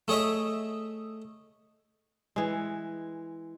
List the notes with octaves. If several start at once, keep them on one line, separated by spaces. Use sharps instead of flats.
A3 G#4 C#5 D#5 E5
E3 G#3